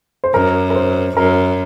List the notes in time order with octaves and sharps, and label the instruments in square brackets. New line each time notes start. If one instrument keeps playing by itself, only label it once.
[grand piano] C5
[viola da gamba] F#2 [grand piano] A#4
[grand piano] A#4
C5
[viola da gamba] F#2 [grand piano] A#4